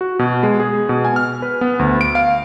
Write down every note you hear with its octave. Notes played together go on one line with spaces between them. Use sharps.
F#4
B2
G#3
G#4
B2
G#5
F6
B4
B3
D2
D7
F5